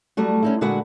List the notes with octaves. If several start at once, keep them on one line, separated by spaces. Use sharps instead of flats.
F#3 G3 A3 F#4
C#4 D#4 E4
A#2 D3 G#3 F#4 B4 F#5